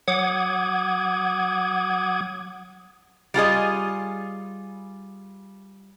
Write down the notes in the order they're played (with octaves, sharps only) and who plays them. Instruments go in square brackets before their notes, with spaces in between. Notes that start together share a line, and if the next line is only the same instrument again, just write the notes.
[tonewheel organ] F#3 F#5 D6 D#6 G#6
[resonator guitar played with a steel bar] G3 F4 G#4 D#5